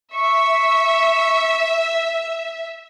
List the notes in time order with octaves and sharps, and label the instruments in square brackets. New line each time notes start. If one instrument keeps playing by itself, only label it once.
[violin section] E5 [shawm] C#6